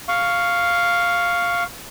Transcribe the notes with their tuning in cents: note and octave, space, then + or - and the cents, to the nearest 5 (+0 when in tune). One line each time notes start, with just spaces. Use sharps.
F5 +0 C#6 +5